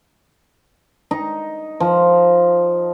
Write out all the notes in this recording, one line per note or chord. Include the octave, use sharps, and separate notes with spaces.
D#4
F3